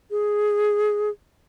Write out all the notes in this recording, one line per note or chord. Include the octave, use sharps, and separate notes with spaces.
G#4